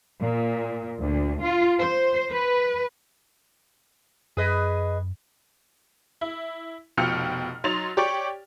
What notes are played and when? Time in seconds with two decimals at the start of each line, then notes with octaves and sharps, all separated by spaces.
0.20 A#2
0.99 D2
1.43 F4
1.80 C5
2.31 B4
4.37 F#2 G#4 B4 D#5
6.21 E4
6.97 F1 B2 F3 G5 F6 C#7
7.64 F#3 D#4 C6 A6 F7
7.97 G4 C#5 D5 G5